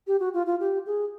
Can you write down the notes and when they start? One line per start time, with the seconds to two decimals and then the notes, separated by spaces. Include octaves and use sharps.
0.07 G4
0.20 F#4
0.34 F4
0.46 F4
0.60 G4
0.86 G#4